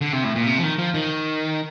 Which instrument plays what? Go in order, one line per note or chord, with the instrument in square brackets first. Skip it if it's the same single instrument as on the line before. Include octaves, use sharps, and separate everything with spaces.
[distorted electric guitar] D3
C3
A2
A#2
C3
F3
D#3
F3
D#3